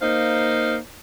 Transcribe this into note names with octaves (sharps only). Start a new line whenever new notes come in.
A#3 D#4 C5 F5